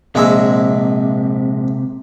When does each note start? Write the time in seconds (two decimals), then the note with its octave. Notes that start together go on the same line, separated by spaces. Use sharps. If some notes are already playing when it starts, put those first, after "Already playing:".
0.15 A#1 C3 G#3 E5